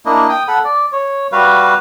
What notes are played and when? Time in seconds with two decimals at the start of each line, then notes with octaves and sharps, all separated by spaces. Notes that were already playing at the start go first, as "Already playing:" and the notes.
0.06 A#3 D4 E4 D#5
0.29 G5 D#6
0.48 A4 F#5 B5
0.64 D5
0.92 C#5
1.32 G3 F#4 B4 F5